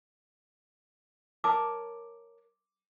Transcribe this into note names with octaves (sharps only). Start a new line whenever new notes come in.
A#4 C#5 A5 D6